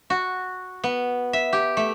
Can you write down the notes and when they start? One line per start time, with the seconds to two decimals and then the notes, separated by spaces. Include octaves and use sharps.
0.10 F#4
0.84 B3
1.33 E5
1.53 G4
1.77 A3